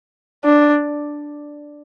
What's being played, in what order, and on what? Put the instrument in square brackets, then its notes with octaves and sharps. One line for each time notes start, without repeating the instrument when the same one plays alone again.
[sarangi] D4